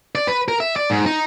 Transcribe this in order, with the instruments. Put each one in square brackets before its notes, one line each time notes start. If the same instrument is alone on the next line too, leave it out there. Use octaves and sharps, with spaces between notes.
[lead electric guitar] D5
B4
A#4
E5
D5
G#2
D#4